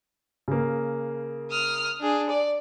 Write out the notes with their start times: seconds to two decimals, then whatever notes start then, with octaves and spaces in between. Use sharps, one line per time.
0.48 C#3 A#3
1.50 D#6 F6
1.99 D4 G#4
2.29 D5